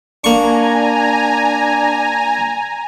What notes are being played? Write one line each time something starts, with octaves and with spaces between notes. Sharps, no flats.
A#3 D4 G#5 A#5 C#6